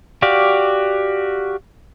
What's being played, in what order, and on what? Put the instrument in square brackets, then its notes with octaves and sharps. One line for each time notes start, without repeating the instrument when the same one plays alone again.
[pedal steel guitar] F#4 G4 D5 F5